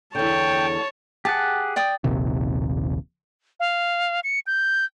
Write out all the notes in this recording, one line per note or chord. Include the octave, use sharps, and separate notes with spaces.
E2 D3 C#5 G5 A5
G4 G#4 F#5 A5
D5 G5 D#6
D#1 A#1 D#2 C3
F5
C#7
G6